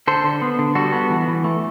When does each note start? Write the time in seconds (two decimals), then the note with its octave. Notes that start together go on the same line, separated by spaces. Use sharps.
0.07 D3 A4 C5
0.24 D3
0.42 B3
0.59 D3
0.75 G3 F#4 A4
0.93 B3
1.10 E3
1.28 E3
1.44 A3